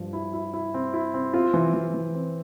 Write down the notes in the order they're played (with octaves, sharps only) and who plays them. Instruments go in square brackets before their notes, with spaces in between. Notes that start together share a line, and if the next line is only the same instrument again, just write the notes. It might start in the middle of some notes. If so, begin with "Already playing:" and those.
Already playing: [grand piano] G2 F3
E4
E4
E4
C4
E4
C4
[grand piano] C4 [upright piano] F4
[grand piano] E3
E3
E3
C4